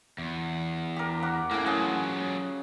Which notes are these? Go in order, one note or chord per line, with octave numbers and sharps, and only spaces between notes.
E2
G4 A#4
F#5 D6
A2 C#3 A#3
F#3 F4 G#4 D#5 F#5